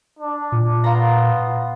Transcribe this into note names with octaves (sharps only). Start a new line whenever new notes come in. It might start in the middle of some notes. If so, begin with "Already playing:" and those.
D4
A#2
B3 F4 A#5